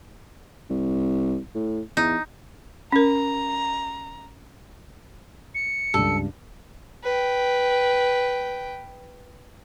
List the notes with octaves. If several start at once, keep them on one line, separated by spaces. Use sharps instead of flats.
C2
A2
E2 D#4
C#4 A#4 A#5
C#7
C#2 G2 A4
B4 G5